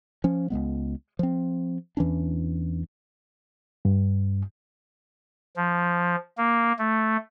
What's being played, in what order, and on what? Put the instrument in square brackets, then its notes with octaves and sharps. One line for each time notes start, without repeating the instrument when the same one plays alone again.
[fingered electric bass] F3 C#4
C#2 G#2 G#3 B3
F3 C4
E2 E3 C#4 D4
[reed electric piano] G2
[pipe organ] F3
A#3
A3